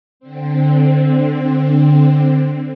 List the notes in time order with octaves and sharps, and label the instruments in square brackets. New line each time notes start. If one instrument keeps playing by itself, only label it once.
[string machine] D3 C4